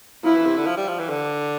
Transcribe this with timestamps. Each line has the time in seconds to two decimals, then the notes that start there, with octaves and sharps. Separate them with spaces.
0.24 F3 E4
0.35 E3
0.46 C3
0.57 D3
0.66 F3
0.77 G3
0.88 F3
0.99 E3
1.10 D3